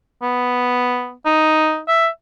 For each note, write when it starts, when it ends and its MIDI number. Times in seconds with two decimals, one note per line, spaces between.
0.23 1.12 59
1.26 1.80 63
1.88 2.08 76